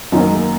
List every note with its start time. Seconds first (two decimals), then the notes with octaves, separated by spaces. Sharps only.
0.12 F#2 D#3 F#3 C#4 D#4
0.20 A#3
0.28 G#3
0.36 A#3